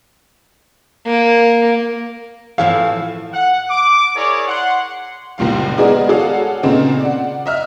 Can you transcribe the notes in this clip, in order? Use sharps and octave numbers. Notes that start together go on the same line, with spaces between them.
A#3
A2 E3 F3 F5
F#5
D6
E4 G#4 A#4 C#5 D5
F#5 C6
F#1 C#2 A#2 G3 F5
G#3 B3 G#4 A#4 D5 D#5
F#4 G#4 A4 C#5 D5 F5
A#2 C#3 B3 C4 D#4
D5 F#5
D#5 E5 F6